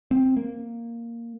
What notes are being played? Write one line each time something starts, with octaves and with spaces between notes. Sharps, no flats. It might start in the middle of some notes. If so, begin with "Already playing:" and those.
C4
A#3